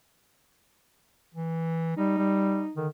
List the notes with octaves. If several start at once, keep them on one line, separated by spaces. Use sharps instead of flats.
E3
G3 D#4
G3
D3 D#3